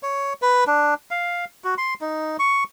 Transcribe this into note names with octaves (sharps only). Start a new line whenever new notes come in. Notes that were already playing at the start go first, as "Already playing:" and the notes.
C#5
B4
D4
F5
F#4
C6
D#4
C#6